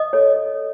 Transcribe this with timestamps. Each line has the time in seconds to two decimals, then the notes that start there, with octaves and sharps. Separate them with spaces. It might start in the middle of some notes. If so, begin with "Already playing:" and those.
Already playing: D#5 D#6
0.13 A4 C#5